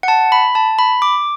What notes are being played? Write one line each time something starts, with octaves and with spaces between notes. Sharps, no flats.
F#5
A5
B5
A5
B5
D6